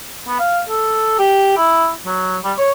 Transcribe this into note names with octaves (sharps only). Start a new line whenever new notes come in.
B3
F5
A4
G4
E4
F#3
G3
C#5